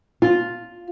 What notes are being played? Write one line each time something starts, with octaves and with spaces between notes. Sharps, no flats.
F4